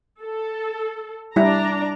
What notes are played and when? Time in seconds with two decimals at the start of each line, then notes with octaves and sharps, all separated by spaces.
0.21 A4
1.36 G3 D4 E4 A#5